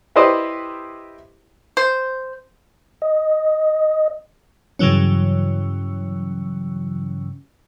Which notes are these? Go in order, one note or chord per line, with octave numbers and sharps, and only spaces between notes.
E4 G4 B4 C5 D5 D#5
C5
D#5
G2 C#3 E3 F#3 C#4